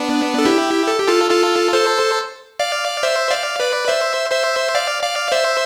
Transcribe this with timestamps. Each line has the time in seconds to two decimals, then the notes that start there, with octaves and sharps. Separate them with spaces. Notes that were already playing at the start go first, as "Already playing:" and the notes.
Already playing: B3 D4
0.38 A4
0.45 E4 G4
0.88 A4
0.98 G4
1.08 F4 A4
1.30 F4 A4
1.73 A4 C5
2.59 D5 F5
3.03 C5 E5
3.30 D5 F5
3.60 B4 D5
3.88 C5 E5
4.31 C5 E5
4.75 D5 F5
5.03 D5 F5
5.32 C5 E5